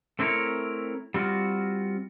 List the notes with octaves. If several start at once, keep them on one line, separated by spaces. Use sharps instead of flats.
A3 C4 D4 E4 A#4 C#5
G3 C4 F4 F#4